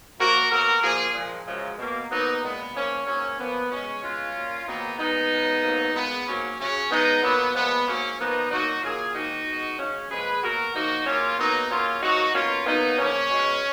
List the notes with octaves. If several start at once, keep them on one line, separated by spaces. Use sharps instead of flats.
F#2 F3 A#3 F#4 A#4
B2 F#3 A#3 F#4 A#4
A#2 F3 A#3 F4 G#4
A#2 F3 G#3
F#2 C#3 F3 G#3
B2 A#3
G#2 F#3 A#3 B3 D#4
A#2 G#3 B3
G#2 F3 A#3 C#4
G#2 F#3 A#3 C#4
A#2 F3 A#3 B3
B2 G#3 C#4
B2 G#3 C#4 F4
A#2 F#3 A#3
G#2 D#3 F#3 A#3 B3 D#4
A#2 G#3 B3 D#4
F#2 C#3 G#3
G#2 F#3 A#3
A#2 G#3 B3
G#2 F#3 A#3 C#4
F#2 C#3 F#3 C#4
C#3 G#3 B3 D#4
A#2 F#3 A#3 B3
A#2 F3 G#3 B3
G#2 F#3 A#3 C#4
A#2 F3 A#3 B3 D#4
A#2 F#3 A#3 D#4 F#4
C#3 F#3 A#3 F4 G#4
G#2 D#3 A#3 D#4 F#4
B2 G#3
F#2 C#3 G#3 C#4
A#2 F3 G#3 G#4 B4
B2 F#3 A#3 F#4 A#4
C#3 F3 A#3 D#4 F#4
C#3 F#3 A#3 C#4 F4
C#3 F#3 A#3 B3 D#4
C#3 F#3 A#3 C#4 F4
G#2 F#3 A#3 D#4 F#4
B2 A#3 C#4 F4
B2 F#3 A#3 B3 D#4
C#3 F3 A#3 C#4
B2 G#3